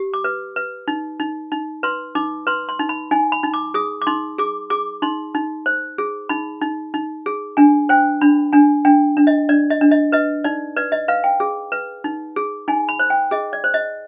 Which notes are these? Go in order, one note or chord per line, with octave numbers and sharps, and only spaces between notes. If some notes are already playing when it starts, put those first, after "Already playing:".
Already playing: G4
D6
B4
B4
D#4
D#4
D#4
B4 C6
D#4 D6
B4 C6
C6
D#4
B5
D#4 G#5
B5
D#4
D6
G#4 D#6
D6
D#4 C6
G#4 D6
G#4 D6
D#4 C6
D#4
C5
G#4
D#4 B5
D#4
D#4
G#4
D4 G#5
C5 G5
D4 B5
D4 G#5
D4 G5
D4
D#5
D4 D5
D#5
D4
D#5
B4 D#5
D#4 D5
B4 D5
D#5
B4 F5
G5
G#4
B4
D#4
G#4
D#4 G#5
B5
C5
G5
G#4 D#5
D5
C5
D#5